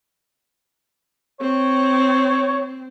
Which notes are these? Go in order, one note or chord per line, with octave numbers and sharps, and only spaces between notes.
C4 C#5